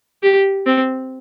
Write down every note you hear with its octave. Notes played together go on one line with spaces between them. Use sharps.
G4
C4